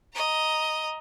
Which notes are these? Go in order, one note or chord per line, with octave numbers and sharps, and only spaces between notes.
D#5 A#5